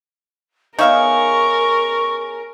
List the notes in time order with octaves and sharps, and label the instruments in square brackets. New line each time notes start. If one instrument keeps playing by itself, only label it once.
[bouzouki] B3 C#4 G#4 [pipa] D#4 E5 F5 [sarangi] A#4 [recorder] C#6